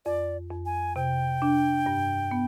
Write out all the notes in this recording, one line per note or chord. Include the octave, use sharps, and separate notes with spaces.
F2 D5
F2
G#5
C3 G5
D4
G2
B3